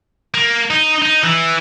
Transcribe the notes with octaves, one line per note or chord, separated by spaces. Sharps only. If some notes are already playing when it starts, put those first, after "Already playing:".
A#3
D#4
D#4
E3